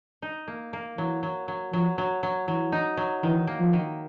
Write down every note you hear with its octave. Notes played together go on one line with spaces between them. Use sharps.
D#4
A#3
A#3
E3 F#3
F#3
F#3
F3 F#3
F#3
F#3
E3 F#3
D#4
F#3
D#3 E3
A#3
F3
D#3